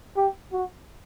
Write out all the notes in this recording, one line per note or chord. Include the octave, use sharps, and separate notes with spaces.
G4
F#4